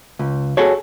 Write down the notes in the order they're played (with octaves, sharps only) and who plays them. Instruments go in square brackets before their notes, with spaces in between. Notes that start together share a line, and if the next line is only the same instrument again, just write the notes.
[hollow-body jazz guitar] C#2
F#4 G#4 A4 C#5